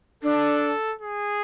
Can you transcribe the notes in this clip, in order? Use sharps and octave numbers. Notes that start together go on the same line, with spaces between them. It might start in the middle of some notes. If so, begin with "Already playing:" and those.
D4 A4
G#4